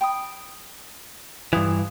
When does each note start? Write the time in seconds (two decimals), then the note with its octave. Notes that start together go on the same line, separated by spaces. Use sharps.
0.01 G5 B5 D#6
1.53 G2 E3 F4 D#6